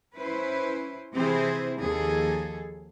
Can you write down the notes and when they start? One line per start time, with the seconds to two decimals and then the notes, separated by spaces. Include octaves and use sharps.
0.14 C#4 E4 B4 C5
1.14 C3 E3 C4 E4 G#4 C5
1.80 D#2 F3 G#4 A4